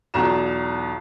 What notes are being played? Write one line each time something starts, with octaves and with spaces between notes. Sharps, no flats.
B1 E2 F4 F#4 A#5 E7